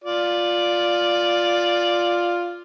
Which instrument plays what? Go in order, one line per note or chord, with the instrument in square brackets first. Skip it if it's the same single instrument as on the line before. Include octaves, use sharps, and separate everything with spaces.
[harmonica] F4 D5